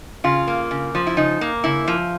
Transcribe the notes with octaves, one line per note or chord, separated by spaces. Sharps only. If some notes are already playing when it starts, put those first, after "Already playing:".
C#3 F4
A#3
C#3
F3
E4
C#3 D#4
A#3
C#3 E4
F3